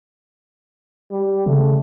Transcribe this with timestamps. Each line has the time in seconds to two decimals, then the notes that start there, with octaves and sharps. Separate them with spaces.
1.11 G3
1.46 C#3 A3